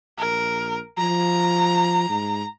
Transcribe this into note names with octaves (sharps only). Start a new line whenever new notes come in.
A#1 A#4
F3 A#5
G#2